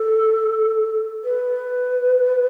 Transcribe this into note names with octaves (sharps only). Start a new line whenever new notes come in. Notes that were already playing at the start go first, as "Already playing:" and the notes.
Already playing: A4
B4